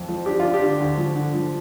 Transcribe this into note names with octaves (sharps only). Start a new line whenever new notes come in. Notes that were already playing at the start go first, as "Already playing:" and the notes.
Already playing: F2
F3
D4 G4
D4 F4
G4
D3
D2
F3
D3
F3